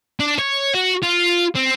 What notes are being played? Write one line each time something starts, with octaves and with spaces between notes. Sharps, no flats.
D4
C#5
F#4
F4
C4